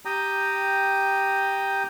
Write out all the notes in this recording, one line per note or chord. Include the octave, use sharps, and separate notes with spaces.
G4 G5 A#5 D#6